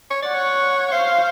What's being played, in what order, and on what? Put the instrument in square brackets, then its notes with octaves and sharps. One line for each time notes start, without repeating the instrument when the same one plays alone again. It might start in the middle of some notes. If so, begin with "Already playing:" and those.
[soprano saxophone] C#5
[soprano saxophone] D5 [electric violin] F#5
[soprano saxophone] C#5
[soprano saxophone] C5 [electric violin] F5